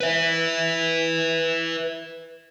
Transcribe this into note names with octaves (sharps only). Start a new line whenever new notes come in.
B4 E5